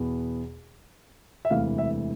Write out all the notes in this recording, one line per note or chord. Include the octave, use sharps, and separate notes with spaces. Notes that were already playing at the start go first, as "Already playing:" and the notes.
Already playing: E2 B2 B3
E5
E1 D2 C3 E3 F5
E5